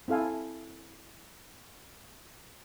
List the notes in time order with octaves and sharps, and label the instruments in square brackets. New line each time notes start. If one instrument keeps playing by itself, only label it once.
[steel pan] C4 E4 A4 F5 G#5